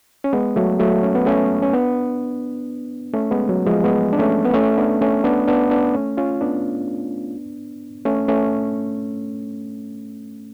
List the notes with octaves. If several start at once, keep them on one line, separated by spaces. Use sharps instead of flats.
C#4
G#3 B3
F#3 A3
F#3 A3
C#4
B3
A3 C#4
C#4
B3 D4
A3 C#4
G#3 B3
F#3
F3 G#3
G#3 B3
D4
A3 C#4
B3
A3 C#4
B3 D4
A3 C#4
B3 D4
B3 D4
B3 D4
A3 C#4
C#4 F4
B3 D4
A3 C#4
A3 C#4